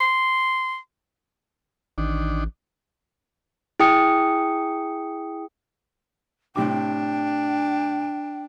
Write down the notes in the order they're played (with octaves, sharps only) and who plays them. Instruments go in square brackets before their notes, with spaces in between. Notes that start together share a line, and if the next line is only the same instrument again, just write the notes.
[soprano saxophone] C6
[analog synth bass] A1 [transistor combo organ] D#3 D4
[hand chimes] E4 G#4 G5 D#6 C#7
[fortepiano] A2 C3 D6 [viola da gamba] D4 [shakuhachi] G5